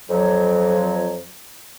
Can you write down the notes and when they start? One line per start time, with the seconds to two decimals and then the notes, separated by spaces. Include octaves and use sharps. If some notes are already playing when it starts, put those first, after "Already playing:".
0.09 F2 F#3